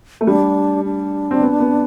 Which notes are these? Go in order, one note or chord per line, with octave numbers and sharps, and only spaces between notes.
A3
G3 D4
D4
C4
B3
B3